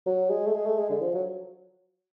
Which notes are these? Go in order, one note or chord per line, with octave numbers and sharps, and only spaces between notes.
F#3
G#3
A3
G#3
A3
G#3
D3
F3
F#3